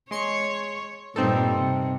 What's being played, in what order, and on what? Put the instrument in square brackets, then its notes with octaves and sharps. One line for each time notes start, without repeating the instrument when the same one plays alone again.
[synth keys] G#3 C6 C#7 [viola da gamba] C#5
[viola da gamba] G2 A#2 G3 [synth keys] C4 D#4 A4
[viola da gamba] C3